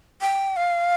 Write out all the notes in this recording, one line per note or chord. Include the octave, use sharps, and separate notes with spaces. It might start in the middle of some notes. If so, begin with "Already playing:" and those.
G5
F5